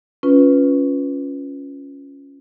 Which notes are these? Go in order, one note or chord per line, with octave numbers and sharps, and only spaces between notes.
C#4 F4 B4